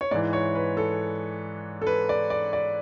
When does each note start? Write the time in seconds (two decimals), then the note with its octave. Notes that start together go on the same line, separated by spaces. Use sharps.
0.01 C#5
0.11 G#2 D5
0.15 E3
0.33 C#5
0.55 B4
0.77 A4
1.82 A4
1.87 B4
2.09 D5
2.30 D5
2.53 D5